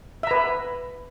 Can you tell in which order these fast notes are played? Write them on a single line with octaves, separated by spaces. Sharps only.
E5 A#5 B4